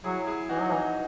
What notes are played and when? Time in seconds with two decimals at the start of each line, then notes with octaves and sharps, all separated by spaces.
0.04 F#3 E4 G#4
0.27 E4 G#4
0.49 E3 D#4 F#4
0.60 F#3
0.71 E3 D#4